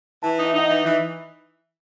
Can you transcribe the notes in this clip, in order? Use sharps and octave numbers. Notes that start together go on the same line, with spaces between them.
E3 A5
D#4
E5
D#4 F#5
D#5
E3 E5
E3